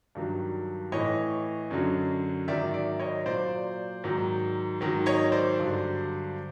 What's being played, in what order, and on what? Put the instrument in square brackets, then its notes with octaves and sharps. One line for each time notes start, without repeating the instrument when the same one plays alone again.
[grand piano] G2 D#3 F#3
A2 E3 C#5 D#5
F#2 D3 F#3
G#2 D#3 F#3 D5 E5
D5 E5
C#5 D#5
A#2 F#3 C5 D5
G#2 D#3 F#3
G#2 D#3 F#3
C#5 D#5
C5 D5
G2 D3 F#3